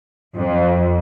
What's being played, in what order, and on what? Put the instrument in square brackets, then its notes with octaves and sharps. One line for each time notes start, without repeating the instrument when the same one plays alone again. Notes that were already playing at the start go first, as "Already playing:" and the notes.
[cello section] F2